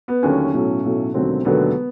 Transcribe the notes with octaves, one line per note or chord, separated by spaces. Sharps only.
B3
D#2 D3 F#3 A3 C#4
B1 A2 F#3 A3
B1 A2 F#3 A3
E1 D#2 D3 F#3 A3 C4
E1 D#2 D3 F#3 A3 B3